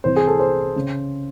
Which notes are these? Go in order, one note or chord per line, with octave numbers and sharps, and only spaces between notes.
C2 C3 E3 C4 C5
G#4
A4
C5
C#3